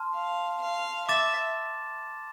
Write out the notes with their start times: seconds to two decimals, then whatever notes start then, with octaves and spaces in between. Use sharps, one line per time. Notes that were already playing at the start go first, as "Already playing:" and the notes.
Already playing: A5 C6 F6
0.14 F5
0.62 F5
1.08 E5 D6 A6 E7